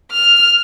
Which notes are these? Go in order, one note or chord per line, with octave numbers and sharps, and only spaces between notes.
F6